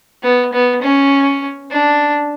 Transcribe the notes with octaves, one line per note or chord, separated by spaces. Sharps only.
B3
B3
C#4
D4